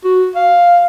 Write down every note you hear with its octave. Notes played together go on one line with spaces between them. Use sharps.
F#4
F5